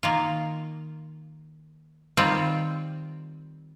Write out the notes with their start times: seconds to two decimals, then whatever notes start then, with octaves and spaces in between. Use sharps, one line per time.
0.03 D#3 A#3 F4
2.17 D#3 G3 C4 F4